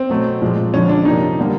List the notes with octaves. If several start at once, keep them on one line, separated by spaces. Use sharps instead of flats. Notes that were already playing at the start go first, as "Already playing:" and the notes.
Already playing: C4
B2 F#3 A3
A#2 F3 G#3
F2 D3 F3 G#3 C#4
D4
C3 F3 A#3 D#4
D3 G3 A#3